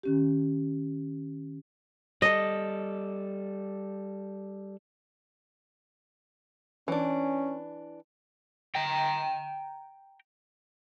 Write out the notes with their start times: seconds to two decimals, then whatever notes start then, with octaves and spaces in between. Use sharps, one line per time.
0.03 D#3 C#4 G4
2.22 G3 A4 D#5
6.88 E3 C#4 D4
8.75 G5 A#5